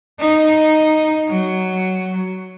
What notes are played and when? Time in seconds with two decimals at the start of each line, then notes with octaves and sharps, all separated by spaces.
0.20 D#4
1.28 F#3